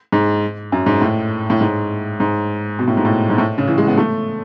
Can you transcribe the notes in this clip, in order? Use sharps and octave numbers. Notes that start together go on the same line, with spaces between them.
G#2
F#2
G#2
A2
A2
G#2
G#2
B2
A2
G#2
A2
G#2
A2
C#3
E3
G#3
B3
A3